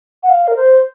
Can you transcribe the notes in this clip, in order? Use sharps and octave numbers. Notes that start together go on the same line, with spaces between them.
F#5
F5
A#4
C5